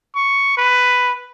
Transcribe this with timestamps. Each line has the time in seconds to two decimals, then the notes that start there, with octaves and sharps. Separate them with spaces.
0.15 C#6
0.57 B4